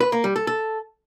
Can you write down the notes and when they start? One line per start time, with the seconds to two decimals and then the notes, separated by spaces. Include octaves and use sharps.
0.01 B4
0.12 A#3
0.24 G3
0.36 A4
0.47 A4